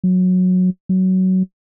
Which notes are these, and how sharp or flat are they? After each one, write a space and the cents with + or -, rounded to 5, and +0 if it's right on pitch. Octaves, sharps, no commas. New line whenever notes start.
F#3 -15
F#3 +15